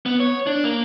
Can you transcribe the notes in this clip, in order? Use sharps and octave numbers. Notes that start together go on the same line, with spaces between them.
B3
C#5
D4
A#3